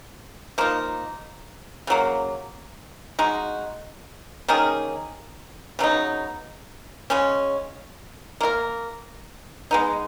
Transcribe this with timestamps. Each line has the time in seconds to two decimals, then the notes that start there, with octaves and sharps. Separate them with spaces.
0.58 F3 A#3 D#4
1.87 C#3 F#3 A#3
3.19 G#3 D#4 F#4
4.48 D#3 A#3 C#4 G#4
5.79 C#3 F#3 B3 D#4
7.10 C#3 G#3 C#4
8.41 A#3 F4 A#4
9.71 G#3 B3 D#4